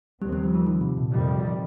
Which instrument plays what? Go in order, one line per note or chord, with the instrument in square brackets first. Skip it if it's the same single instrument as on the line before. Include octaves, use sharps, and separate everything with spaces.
[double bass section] D#2 D#3 C4 [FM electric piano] G3
[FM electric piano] G3
F3
F3
D#3
C3
A#2
[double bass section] F2 C3 D#3 G3